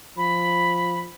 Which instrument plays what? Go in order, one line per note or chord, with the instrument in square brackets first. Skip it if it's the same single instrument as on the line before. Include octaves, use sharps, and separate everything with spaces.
[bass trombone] F3 [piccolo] B5